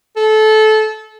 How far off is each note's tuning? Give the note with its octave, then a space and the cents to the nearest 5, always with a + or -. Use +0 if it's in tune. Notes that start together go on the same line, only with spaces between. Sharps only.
A4 -20